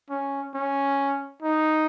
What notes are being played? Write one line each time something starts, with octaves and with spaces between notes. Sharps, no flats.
C#4
C#4
D#4